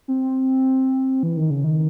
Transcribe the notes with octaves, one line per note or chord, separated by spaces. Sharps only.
C4
E3
D#3
C#3
D#3